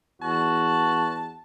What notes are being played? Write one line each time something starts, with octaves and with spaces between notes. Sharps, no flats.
E2 F#4 A5